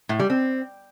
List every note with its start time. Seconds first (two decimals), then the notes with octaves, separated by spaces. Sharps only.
0.09 A2
0.19 G3
0.30 C4